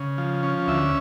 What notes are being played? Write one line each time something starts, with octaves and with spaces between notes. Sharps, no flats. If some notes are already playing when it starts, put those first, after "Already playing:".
Already playing: C#3
F3
C#4
D2 E5